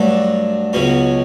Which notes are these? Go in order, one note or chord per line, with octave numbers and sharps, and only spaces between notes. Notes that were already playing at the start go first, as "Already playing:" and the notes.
Already playing: G2 F#3 A3 D4
C#2 B2 F#3 C#4